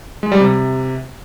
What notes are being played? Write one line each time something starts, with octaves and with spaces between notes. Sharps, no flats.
G#3
G3
C3